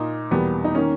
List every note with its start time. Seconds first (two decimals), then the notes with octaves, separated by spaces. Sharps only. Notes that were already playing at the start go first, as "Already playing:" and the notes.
Already playing: A#2 A#3 D#4
0.31 E2 B2 G3 A#3 B3
0.64 D#4
0.75 D#3 A#3 C#4